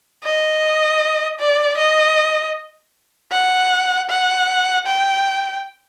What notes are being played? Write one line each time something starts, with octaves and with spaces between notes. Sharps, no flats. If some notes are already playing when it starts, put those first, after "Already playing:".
D#5
D5
D#5
F#5
F#5
G5